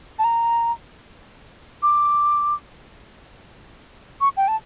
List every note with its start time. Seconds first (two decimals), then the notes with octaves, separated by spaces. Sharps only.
0.19 A5
0.24 A#5
1.83 D6
4.21 C#6
4.37 G5
4.48 A5